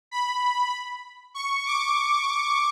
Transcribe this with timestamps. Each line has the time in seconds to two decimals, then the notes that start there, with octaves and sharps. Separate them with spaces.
0.11 B5
1.34 C#6
1.66 D6